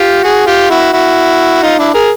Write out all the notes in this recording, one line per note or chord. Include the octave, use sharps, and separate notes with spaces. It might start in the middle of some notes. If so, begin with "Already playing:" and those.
Already playing: F4 G4
F#4 G#4
F4 G4
E4 F#4
E4 F#4
D#4 F4
D4 E4
G#4 A#4